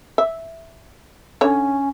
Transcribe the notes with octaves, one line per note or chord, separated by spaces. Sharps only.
E5
D3 C#4 C#5